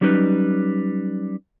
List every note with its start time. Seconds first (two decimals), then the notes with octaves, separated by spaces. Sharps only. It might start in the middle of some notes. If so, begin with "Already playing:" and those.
0.01 F#3 G3 C#4 D#4 B4